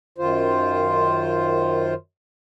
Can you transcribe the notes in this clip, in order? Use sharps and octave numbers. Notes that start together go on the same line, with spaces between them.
F#2 D#3 F4 C5